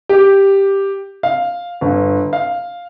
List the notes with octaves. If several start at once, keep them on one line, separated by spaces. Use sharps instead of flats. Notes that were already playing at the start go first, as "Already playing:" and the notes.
G4
F5
G1
F5